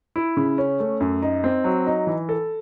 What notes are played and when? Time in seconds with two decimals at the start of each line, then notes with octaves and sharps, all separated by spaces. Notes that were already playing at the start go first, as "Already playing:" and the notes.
0.16 E4
0.37 C#3
0.58 C#4
0.80 A3
1.00 F#2
1.22 D#4
1.44 C4
1.64 F#3
1.86 D#4
2.07 E3
2.29 A4